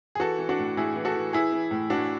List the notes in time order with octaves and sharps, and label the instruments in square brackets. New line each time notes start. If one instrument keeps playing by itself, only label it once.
[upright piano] G#4
E3 F#4 A4
E3
D4 F#4
A2
A2 E4 G#4
E3
F#4 A4
E3
E3 E4 G#4
E3
A2
A2 D4 F#4